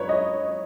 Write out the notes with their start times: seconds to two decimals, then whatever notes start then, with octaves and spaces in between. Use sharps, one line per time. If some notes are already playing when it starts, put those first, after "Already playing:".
Already playing: F#2 B4 C#5
0.09 D#5